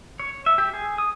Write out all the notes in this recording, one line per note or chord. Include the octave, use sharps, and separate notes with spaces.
C#5
E5
G4
G#4
D#6